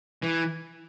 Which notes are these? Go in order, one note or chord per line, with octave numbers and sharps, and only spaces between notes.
E3